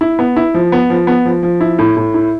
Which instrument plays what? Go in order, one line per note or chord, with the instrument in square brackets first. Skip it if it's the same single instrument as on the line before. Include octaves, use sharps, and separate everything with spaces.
[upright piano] E4
B3
E4
F3
B3
F3
B3
F3
F3
E4
A2
A2
E4